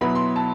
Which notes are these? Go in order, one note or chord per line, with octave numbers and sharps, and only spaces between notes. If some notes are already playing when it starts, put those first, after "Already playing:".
B2 F#3 B3 E4 B5
C6
A5